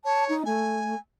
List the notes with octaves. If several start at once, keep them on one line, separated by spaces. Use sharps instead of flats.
C#5 A5
D#4
A3 G#5